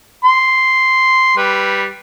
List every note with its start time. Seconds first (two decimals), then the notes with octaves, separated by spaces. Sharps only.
0.25 C6
1.37 G3 B4